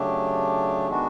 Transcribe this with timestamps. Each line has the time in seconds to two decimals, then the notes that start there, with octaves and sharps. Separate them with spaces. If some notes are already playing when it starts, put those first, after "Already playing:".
Already playing: C#3 F#3 A3 D4 G4
0.89 D#3 G#3 B3 D4 F#4